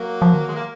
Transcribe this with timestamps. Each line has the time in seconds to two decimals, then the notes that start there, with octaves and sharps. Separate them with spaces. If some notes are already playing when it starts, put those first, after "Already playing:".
Already playing: F#3 A#3
0.22 F3
0.34 D#3
0.46 G#3
0.54 A#3